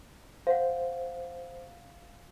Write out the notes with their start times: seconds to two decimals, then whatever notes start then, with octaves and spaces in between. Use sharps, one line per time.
0.47 C5 F5 F#5